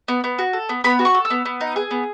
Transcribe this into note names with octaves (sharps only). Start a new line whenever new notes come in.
B3
B3
F#4
A4
B3
B3 B5
F#4
C#6
A4
E6
B3
B3
D#4
G#4
B3